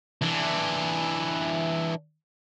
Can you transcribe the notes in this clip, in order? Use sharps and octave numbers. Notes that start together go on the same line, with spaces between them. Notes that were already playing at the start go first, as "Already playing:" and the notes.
E3 D4